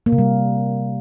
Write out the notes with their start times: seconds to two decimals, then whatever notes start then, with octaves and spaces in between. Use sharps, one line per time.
0.06 A#3
0.12 C3
0.18 G3